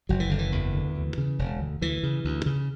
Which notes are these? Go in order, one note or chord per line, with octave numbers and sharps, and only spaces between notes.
F#1 F#3
E3
F#1 D3
E3
E2
D3
D2
C#3
E1
D2
D2 E3
C#3
D2
C#3